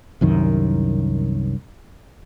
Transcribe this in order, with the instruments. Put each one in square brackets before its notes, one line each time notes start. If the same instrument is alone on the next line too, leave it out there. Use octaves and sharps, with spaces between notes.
[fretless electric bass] C2 F#2 D#3